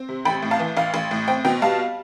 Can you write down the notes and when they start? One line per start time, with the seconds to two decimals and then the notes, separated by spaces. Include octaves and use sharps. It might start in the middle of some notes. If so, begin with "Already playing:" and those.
Already playing: C4
0.09 C3
0.25 A1 G5 B5
0.42 A2
0.51 F5 A5
0.59 E3
0.77 A1 F5
0.94 A1
1.11 A2
1.28 C4 G5
1.45 B2 G5
1.62 G3 F5 A5